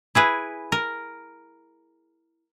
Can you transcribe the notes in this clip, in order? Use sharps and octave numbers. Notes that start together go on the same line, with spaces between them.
E4 G#4 B4
A#4